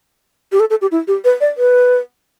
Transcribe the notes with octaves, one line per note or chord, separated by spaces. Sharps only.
G4
A4
A4
G4
E4
G4
B4
D5
B4